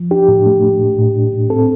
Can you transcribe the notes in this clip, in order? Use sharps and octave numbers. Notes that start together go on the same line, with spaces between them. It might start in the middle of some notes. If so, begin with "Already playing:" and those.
Already playing: F3
D4 G4
A2
A3
D4
A2
A2
D4
A2
C4 A4